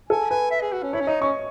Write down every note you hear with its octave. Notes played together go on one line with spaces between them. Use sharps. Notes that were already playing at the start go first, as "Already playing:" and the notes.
A4 G#5
B4 G#5
E5
G#4
F#4
C#4
E4 C#5
C#4
D#4 D#5
C#4 C#6